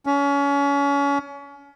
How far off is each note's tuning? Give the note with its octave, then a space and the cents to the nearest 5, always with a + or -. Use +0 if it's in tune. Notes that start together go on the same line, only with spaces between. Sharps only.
C#4 +30